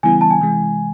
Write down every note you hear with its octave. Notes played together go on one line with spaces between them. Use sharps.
C#3 E3 G3 B3 E4 G#5
A5
G#5
C3 E3 G#3